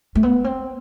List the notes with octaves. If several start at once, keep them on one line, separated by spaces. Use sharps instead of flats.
A3
B3
C4